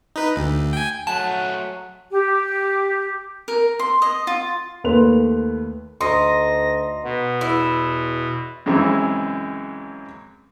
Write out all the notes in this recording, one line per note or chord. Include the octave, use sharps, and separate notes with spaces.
D#4 B4
D2
G5 G#5
F#3 A3 G#4 F#5 A5
G4
A#4
C6
D#5
F4
D#2 A3 B4 C6 F7
D2 D#4 C6 A#6
B2 B3
E2 E4
F#2 C#3 E3 G#3 C4